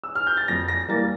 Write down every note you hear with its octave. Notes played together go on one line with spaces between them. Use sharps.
E6
F6
G6
A6
F2 A#6
A#6
E3 G3 A#3 A6